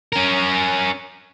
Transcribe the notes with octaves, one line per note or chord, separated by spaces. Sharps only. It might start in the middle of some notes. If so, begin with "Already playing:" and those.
C#4 A#4